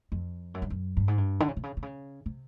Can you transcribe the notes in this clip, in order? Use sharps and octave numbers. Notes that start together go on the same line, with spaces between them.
F2
F#2
G2
F#2
G2
G#2
G2
D3
C#3
C3
C#3
C3
C#3
C3